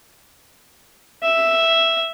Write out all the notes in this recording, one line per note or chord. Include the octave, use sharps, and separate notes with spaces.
E5